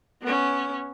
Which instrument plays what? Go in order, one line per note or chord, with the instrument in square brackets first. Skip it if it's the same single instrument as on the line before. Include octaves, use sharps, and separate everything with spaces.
[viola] B3 C#4